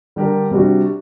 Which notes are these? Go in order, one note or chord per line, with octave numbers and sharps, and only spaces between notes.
D3 G3 D4 G4 A#4
C3 G3 D4 F#4